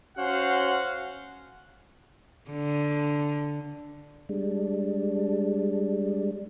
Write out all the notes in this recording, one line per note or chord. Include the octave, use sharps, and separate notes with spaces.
C#4 F#4 C5 F5 F#5
D3
G3 G#3 D4